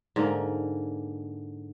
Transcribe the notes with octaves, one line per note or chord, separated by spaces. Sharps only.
G#2 D3 A#3